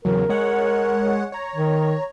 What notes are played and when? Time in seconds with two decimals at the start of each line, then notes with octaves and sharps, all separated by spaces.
0.05 E2 C#3 F#3 A#4
0.29 G#3 C#5 F#5
1.32 C#5 A#5
1.55 D#3